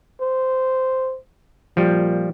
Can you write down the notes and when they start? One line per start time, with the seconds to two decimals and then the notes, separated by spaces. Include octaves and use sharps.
0.21 C5
1.77 A#2 F3 G3